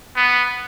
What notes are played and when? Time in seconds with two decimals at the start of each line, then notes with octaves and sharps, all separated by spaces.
0.16 B3